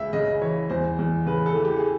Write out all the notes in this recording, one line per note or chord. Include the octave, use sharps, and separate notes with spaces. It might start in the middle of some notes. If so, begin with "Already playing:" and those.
Already playing: C#2 G#3 E5
C#3 D#5
E3 C#5
E2 C5
E2
C#3 B4
A4
E3
G4
G#4